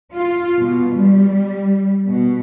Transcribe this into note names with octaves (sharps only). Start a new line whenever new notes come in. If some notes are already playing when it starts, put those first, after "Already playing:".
F4
B2
G3
B2